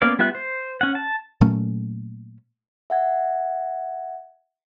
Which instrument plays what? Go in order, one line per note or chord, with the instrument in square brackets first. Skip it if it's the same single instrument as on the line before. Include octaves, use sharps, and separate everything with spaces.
[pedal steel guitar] A#3 B3 C#4 D5 F5
G3 B3 F4 E5 F#6
C5
C#4 F#5
A5
[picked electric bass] A#2 F#3 A3 C#4
[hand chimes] E5 F#5 G#6